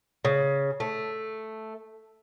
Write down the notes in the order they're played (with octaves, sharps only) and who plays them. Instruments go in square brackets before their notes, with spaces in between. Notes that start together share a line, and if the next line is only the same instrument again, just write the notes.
[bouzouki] C#3
A3